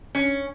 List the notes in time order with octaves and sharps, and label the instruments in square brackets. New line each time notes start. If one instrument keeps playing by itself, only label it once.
[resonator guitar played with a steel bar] C#4